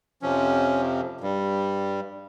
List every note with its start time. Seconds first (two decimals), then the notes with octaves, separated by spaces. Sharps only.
0.22 F2 C3 F3 C#4
1.21 G2 G3